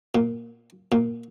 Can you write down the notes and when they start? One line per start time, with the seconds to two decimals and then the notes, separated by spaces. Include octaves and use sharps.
0.15 A#2
0.92 A#2